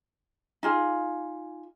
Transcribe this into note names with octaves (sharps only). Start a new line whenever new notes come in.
D#4 F4 G#4